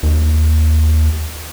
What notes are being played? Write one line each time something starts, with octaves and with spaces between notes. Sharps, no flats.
D#2